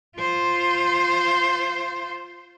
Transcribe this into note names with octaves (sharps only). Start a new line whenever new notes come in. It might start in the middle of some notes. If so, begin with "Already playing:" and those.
F4 C5